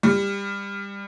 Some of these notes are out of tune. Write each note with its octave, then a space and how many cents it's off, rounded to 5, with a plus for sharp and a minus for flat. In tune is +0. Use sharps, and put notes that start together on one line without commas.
G3 +25